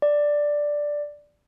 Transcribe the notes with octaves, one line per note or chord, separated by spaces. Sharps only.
D5